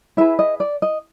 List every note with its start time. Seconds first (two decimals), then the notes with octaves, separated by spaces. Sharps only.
0.17 E4 G#4 B4 E5
0.39 D#5
0.60 D5
0.82 D#5